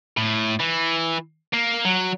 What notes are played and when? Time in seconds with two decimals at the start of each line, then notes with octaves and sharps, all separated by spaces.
0.17 A2
0.60 E3
1.53 A#3
1.85 F#3